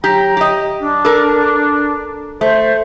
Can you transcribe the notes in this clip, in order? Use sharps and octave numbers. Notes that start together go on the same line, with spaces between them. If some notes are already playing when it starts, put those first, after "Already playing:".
F#3 G4 G5 A#5
G4 D#5
D4
A4 A#4
A3 C5